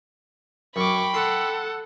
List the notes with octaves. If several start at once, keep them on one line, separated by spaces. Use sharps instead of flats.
F#2 G5 B5 C#6 D6
A4 F#5 C6